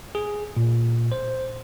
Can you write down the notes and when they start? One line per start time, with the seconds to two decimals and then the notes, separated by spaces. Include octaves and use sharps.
0.15 G#4
0.57 A#2
1.12 C5